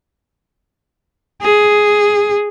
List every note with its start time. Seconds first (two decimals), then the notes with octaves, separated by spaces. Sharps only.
1.42 G#4